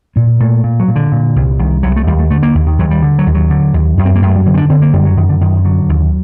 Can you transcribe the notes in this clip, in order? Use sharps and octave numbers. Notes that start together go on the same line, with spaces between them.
A#2 A#3
A#2 A3
A#2
F#3
A#2
D3
A#2
C2
C2 D#3
C2 F#3
A3
D#2 G3
A3
D3 A3
A#3
D#2
D#3
D#2 F#3
G3
D3
F#3
D#2
F#3
D3
D#2
F#2
C4
A#3
F#2 A3
G3
D3 F#3
C4
D4
D3 C4
A#3
F#2 G3
F#3
F#2 D#3
D3
F#2 D#3
D3 F#3
D#2